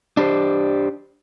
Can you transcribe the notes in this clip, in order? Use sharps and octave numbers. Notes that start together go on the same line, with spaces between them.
D4 G4 C5